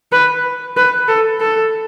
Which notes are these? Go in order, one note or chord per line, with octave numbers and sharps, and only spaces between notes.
B4
B4
A4
A4